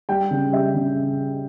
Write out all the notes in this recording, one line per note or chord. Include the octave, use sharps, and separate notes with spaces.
G3 G5
C#3
G3 E5
C#3